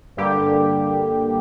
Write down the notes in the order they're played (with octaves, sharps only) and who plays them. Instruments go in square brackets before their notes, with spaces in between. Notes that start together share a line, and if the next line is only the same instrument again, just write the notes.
[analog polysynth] G2 D3 G3 A#3 G4